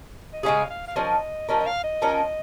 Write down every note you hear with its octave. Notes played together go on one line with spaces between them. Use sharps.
D#5
C#3 G#3 C#4 G#4 F5
F5
F5
F3 C#4 A#4 D#5
F3 C#4 A#4 D#5
D#5
F5
D#5
F3 C#4 A#4